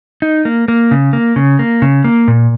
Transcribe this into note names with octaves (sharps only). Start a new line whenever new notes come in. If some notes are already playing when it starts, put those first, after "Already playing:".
D#4
A#3
A#3
C#3
A#3
C#3
A#3
C#3
A#3
A#2